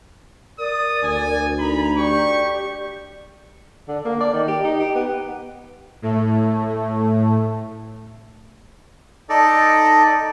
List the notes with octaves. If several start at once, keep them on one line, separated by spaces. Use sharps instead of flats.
A#4 D5 D#6
D2 G#5
D#4 A#5 B5
G4 D5 C#6
D3
A#3
D5
D#3
G4
D#4
G4
B3
A2 A3
D#4 A4 D5